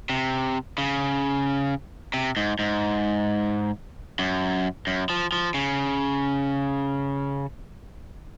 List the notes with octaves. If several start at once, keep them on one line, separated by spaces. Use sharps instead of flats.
C3
C#3
C3
G#2
G#2
F#2
F#2
F3
F3
C#3